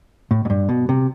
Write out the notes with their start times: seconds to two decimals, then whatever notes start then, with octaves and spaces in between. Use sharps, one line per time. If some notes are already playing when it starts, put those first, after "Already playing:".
0.31 A2
0.45 G#2
0.50 G2
0.69 B2
0.89 C3